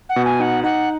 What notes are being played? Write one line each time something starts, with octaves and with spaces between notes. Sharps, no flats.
F#5
B2
G#5
D#4 F#5
D#4 F#5